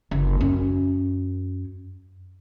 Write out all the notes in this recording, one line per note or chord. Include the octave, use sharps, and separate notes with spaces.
F#1
F#2 C#4